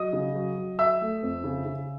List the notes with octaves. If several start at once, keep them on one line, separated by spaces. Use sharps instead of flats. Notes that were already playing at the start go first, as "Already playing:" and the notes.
Already playing: F#3 D#5 D#6
C#3
F#3
F#3
F#3 E5 E6
A3
F2
C#3
C#3